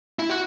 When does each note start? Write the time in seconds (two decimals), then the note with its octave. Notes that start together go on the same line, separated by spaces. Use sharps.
0.19 E4
0.30 F#4